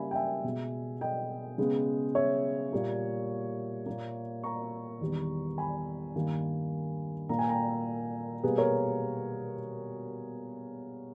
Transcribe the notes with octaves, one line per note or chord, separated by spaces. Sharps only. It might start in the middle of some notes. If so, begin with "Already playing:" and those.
Already playing: C#3 G3 A#3 E5 G#5 B5
G5
E5 G#5
B2 G#3 B3
D#5 G5
C#3 G#3 B3
C#5 E5
A#2 G3 A#3
A#2 A#3
A#5 C#6
E2 D#3 G3 B3
G#5 B5
G2 D#3 G3 A#3
A#2 A#3 A#5
G#5
G5 A#5
B2 G3 A#3 G#4 B4
A#4 C#5